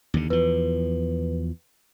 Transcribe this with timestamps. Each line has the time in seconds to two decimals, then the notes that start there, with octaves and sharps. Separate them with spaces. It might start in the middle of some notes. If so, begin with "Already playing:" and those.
0.14 D#2 D3
0.30 E2 F3 B4